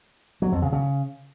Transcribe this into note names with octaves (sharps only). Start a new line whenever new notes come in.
F#3
F2
C#3
C#3